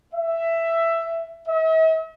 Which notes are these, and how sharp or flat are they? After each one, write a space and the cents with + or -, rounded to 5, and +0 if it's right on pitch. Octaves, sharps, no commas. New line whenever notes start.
E5 +10
E5 -45